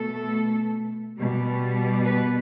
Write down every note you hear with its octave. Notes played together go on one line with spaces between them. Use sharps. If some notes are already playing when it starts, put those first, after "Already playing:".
Already playing: B2 A3 A4
B2 G3
B4